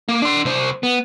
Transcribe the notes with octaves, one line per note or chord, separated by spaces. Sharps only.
A#3
D4 C6
C2 C5
B3